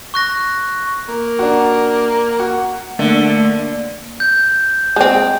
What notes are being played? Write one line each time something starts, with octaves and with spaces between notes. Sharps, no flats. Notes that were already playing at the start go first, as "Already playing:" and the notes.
C#6 F#6 A#6
A#3
D4 F#4
F#4
D3 A3 A#3
G6
G#3 C4